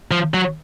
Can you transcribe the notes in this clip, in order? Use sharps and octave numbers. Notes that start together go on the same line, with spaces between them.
F3
F#3